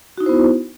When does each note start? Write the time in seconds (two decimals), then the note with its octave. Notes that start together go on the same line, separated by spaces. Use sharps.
0.18 F#4
0.20 D#4
0.23 E4
0.26 C5
0.29 B3